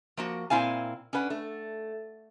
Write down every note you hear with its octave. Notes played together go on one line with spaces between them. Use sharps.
F3 A#3 F#4
A#2 C4 E4 F5 G#5
C#4 D4 B4 F#5
A3